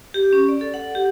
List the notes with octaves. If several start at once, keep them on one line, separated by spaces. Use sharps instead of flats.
G4
C#4
D5
A4
F#5
G4